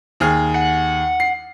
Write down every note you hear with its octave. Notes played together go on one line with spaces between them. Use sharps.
D#2 G#4 F6
F#5
C7